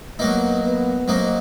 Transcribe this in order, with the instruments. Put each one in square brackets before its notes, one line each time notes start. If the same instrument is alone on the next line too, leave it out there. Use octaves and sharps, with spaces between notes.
[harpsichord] F#3 A#3 D#4 [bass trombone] B3
[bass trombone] B3
[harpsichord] F#3 A#3 D#4 [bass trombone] C4